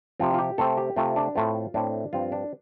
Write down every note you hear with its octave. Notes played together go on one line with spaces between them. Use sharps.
C3 F3 C4 F4
F4
G4
C3 A3 C4 A4
G4
C3 A3 C4 F4
D4
A2 A3 C4 F4
A2 A3 C4 D4
G2 F3 C4 F4
D4